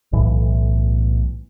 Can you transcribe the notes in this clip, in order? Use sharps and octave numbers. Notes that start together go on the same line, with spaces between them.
B1 A2 E3